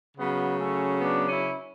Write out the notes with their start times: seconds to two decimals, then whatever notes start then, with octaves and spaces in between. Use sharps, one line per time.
0.16 C#3 F#3 B3
0.59 A3 C#4
1.01 B3 D4
1.29 C#4 E4